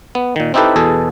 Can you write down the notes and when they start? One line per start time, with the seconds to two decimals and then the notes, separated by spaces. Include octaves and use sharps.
0.15 B3
0.36 A#2 D#3
0.54 C4 D#4 E4 G4 A4 B4
0.76 E2 B2 G#4 A4